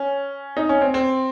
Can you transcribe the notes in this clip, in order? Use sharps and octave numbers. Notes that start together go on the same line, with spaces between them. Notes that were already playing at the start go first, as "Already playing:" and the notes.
Already playing: C#4
D#4
C#4
C4
C4